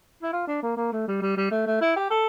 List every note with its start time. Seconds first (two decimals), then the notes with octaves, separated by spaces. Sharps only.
0.23 E4
0.32 F4
0.47 D4
0.63 A#3
0.77 A#3
0.92 A3
1.08 G3
1.22 G3
1.37 G3
1.51 A3
1.66 A3
1.81 E4
1.96 G4
2.10 A4